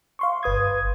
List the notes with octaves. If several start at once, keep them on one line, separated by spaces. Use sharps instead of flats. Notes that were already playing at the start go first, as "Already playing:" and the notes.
F5 C6 C#6
G1 B4 D#6 G#6